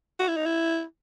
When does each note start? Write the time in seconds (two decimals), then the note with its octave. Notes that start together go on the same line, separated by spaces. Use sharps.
0.19 F#4
0.28 E4
0.37 D#4
0.46 E4